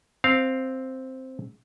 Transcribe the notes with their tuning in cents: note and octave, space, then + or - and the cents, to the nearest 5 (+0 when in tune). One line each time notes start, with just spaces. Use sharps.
C4 +0 F5 +0